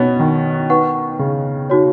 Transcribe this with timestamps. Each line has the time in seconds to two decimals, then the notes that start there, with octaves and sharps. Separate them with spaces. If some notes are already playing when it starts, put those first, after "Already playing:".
Already playing: B2 B3 C#4
0.20 D#3
0.70 D#4 B4 F#5 C#6
1.19 C#3
1.70 D#4 F#4 C#5